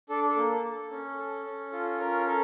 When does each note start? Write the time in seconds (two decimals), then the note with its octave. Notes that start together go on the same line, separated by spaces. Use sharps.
0.09 D4 A4
0.30 A4
0.37 A#3
0.64 A4
0.91 C#4
1.18 A4
1.45 C#4
1.72 F4 A4
1.99 C#4 A#4
2.26 A4 A#4